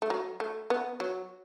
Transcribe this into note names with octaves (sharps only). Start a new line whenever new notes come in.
A3
F#3
A3
B3
F#3